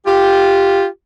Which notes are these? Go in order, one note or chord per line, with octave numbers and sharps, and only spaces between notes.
F4 G4